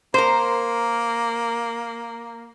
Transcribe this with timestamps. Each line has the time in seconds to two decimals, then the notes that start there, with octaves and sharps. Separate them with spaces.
0.14 A#3 A#4 C5